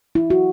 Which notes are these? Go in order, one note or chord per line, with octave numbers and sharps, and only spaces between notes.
E4
F#4